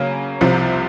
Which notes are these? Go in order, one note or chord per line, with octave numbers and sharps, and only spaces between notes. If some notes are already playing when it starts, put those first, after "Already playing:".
Already playing: C#3 F#3 A#3 C#4
C2 C3 F3